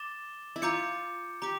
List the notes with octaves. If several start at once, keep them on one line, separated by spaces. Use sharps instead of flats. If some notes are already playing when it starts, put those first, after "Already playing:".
Already playing: D6 A6 E7 G7
E4
F4 A#5 D6 G6 C#7
G4 A#5 D6